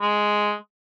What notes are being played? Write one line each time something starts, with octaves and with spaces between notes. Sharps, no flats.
G#3